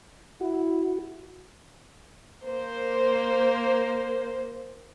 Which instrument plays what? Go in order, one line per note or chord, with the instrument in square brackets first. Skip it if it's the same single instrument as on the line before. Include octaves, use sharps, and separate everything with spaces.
[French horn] E4 [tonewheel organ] F#4
[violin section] A#3 C5